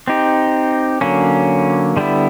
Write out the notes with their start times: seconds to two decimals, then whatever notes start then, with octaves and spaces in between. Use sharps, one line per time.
0.08 C4 D#4 G4
1.01 D3 F#3 A#3 C#4
1.97 D3 G3 B3 E4